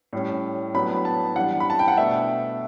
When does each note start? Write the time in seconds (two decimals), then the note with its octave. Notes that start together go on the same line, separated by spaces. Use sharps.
0.13 A2 G3 C#4
0.74 A2 F#3 B3 D4 B5
1.05 A5
1.36 E3 G3 D4 F#5
1.60 B5
1.70 A5
1.79 G5
1.88 F#5
1.97 B2 A3 D4 E5